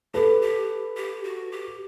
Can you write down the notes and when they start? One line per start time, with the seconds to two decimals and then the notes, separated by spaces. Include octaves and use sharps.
0.14 G4 A4 B4
0.42 G4
0.97 G4
1.24 F#4
1.52 G4